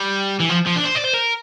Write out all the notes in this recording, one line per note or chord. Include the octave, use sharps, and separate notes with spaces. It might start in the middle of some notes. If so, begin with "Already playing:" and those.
Already playing: G3
E3
F3
F3
D4
C5
D5
C5
A#4